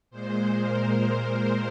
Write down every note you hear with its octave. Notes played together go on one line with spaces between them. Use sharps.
A#2 G#3 C5
A#4